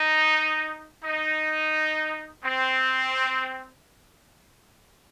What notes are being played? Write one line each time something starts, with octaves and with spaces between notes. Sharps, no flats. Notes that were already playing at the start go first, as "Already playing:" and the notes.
Already playing: D#4
D#4
C4